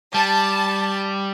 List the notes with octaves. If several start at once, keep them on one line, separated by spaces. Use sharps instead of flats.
G3 A5